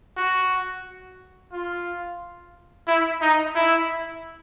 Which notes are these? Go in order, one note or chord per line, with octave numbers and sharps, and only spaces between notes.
F#4
F4
E4
D#4
E4